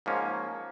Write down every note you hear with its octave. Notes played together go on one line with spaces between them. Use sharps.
G#2 F3 A#3 C#4